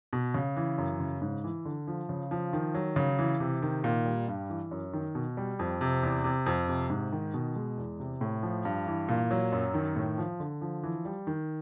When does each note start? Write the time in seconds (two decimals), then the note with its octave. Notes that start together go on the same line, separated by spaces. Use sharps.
0.13 B2
0.34 C#3
0.57 E3
0.78 F#2
1.00 C#3
1.22 G#2
1.44 E3
1.65 D3
1.88 F3
2.09 C#3
2.31 F3
2.53 D#3
2.74 F#3
2.96 C#3
3.19 E3
3.40 C3
3.62 D#3
3.84 A#2
4.06 G3
4.28 G2
4.50 E3
4.71 F#2
4.93 D#3
5.15 B2
5.37 G3
5.59 F2
5.81 C3
6.03 E2
6.24 C3
6.46 F2
6.68 C3
6.90 G#2
7.12 D#3
7.34 B2
7.56 G#3
7.77 E2
7.99 C3
8.21 A2
8.43 F3
8.65 G2
8.87 E3
9.08 A#2
9.31 F#3
9.52 F#2
9.74 D#3
9.96 A2
10.17 F3
10.40 D3
10.61 F3
10.83 E3
11.05 G3
11.27 D#3